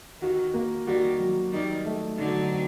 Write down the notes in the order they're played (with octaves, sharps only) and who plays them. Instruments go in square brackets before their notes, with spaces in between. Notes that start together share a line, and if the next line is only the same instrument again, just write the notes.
[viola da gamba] D#3 [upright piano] F#4
[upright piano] A#3
[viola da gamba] D#3 G3 [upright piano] F#4
[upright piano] F#3
[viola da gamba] D#3 G3 [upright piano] D#4
[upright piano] A3
[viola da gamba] D3 F#3 [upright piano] D#4
[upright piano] C4